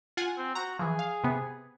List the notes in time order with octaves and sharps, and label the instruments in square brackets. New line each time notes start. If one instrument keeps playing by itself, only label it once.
[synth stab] F4 F#5 G#5
[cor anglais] C4
[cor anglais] F#4 [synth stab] A#5
[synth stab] E3 F3 [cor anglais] G#4
[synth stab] F5
C3 B3